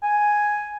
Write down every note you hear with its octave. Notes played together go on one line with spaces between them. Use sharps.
G#5